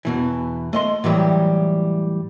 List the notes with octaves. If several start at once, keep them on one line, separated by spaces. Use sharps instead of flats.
E2 B2 E3
A3 D#5 C6
A2 E3 F#3 G3